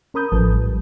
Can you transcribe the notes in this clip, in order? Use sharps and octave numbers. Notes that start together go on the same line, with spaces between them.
C#4 A#4 B5 D#6 G6
A1 F3 A4 B4 A5
G3